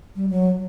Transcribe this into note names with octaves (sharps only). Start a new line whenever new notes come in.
G3
F#3